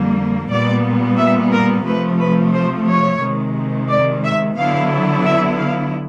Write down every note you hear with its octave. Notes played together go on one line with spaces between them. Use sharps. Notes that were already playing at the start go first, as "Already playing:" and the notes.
Already playing: F2 D3 G3 A#3
A#2 G3 B3 D5
E5
A#4
C3 F3 A3 B4
B4
C5
C#5
C3 D#3 G#3
D5
E5
D3 F#3 B3 E4 F5
E5
F5